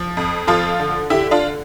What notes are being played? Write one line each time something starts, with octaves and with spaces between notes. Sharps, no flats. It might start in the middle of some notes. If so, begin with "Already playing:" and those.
Already playing: F3
F2
F3 F4 A4
D3
D3 E4 G4
D4 F4